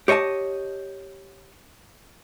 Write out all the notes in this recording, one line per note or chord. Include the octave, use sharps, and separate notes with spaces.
G4 C#5 D#5 E5 A5